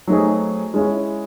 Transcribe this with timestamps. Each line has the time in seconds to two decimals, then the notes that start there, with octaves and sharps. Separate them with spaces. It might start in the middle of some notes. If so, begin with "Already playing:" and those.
0.07 F#3 A3 C4 D#4 G#4
0.74 G#3 C#4 E4